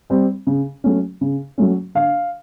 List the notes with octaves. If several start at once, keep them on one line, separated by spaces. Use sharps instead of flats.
G3 C4
C#3
F#3 A3 C#4
C#3
F#3 A3 C#4
D3 F5